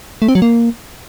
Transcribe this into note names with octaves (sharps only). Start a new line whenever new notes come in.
A3
C4
F#3
A#3